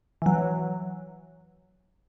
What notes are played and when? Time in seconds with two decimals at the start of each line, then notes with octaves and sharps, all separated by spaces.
0.22 E3 F#3